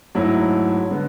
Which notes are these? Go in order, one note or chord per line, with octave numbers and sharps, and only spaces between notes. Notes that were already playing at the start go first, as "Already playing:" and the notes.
G#2 F#3 A3 E4
D3 G#3 B3